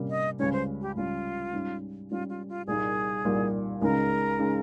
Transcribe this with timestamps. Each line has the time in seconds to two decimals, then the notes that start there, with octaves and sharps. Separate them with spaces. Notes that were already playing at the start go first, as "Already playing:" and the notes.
Already playing: C3 G3 A#3 C#4
0.10 D#5
0.39 C#2 C#3 G3 C#4 C#5
0.53 C5
0.82 G4
0.96 C#2 C#3 G3 C#4 F4
1.53 G#2 G3 C#4
2.10 G#2 G3 C#4 F4
2.29 F4
2.49 F4
2.67 C2 A#2 G3 A#3 D#4 G#4
3.25 C2 A#2 G3 A#3 D#4
3.82 C#2 C#3 G#3 D#4 A#4
4.39 C#3 G#3 D#4